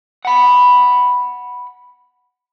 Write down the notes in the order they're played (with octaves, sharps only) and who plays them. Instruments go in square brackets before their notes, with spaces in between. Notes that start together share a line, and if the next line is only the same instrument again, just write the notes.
[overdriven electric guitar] F#5 B5